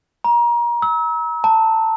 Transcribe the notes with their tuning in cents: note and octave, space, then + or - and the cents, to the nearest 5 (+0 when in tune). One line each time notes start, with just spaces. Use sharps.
A#5 +30
E6 -35
A5 +20